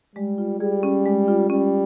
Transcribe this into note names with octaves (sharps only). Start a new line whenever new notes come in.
G3 G#3
F4
G3 G#4
C#4
G#3
F4
G3 C#4